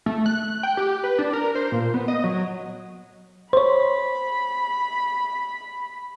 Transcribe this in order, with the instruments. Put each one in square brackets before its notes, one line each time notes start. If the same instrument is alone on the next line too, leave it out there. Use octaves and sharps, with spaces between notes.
[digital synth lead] A3
F#6
G5
G4
B4
D4
A#4
C5
A#2
B3
D#5
F#3
[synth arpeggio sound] C5 C#5 [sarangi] B5